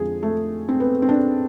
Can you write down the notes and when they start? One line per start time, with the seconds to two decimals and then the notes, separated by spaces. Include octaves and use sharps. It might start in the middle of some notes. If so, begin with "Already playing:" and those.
Already playing: F2 D3 F3 G#3 G#4
0.23 A3
0.69 C4
0.80 B3
1.02 C4
1.09 D4